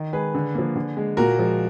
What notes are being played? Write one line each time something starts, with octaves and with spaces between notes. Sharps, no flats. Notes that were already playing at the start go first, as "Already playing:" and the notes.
Already playing: D#3
G#3 G#4 B4
D3
F3 A#3
D3
G#3
A#2 F#4 A#4
F3 G#3